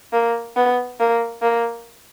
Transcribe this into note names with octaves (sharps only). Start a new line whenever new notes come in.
A#3
B3
A#3
A#3